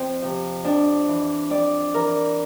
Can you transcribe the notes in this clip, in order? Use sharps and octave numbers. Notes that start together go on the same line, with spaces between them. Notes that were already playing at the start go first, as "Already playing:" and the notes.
Already playing: F2 C4
C3 F3
F2 D4
E3
F2 D5
E3 A#4